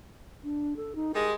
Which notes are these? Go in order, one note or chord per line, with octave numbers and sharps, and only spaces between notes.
D4
A4
D#4
G3 G#3 A#4